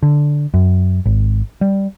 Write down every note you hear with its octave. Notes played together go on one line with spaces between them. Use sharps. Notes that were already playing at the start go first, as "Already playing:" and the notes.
D3
F#2
G#1
G3